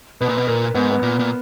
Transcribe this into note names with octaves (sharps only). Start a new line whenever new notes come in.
B2 B4
A#2
B2
A#2 A#4
G#2 B3
B3
A#2
A#2